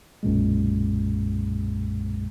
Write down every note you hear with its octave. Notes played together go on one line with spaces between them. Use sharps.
B1 F#2 A#2 G#3